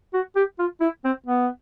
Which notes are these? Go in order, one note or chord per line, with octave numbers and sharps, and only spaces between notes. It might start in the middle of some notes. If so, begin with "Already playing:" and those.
F#4
G4
F4
E4
C4
B3